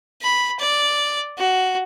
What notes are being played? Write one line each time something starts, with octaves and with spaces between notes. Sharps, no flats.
B5
D5
F#4